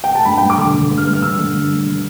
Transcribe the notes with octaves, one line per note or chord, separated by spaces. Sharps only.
G5
A5
G2 B5
G5
G2
D6
D3
D3
G2
F6
G2
F6
D3 E6
D3
G2
G2
D3